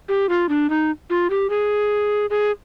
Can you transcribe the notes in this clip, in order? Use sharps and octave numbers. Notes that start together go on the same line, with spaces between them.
G4
F4
D4
D#4
F4
G4
G#4
G#4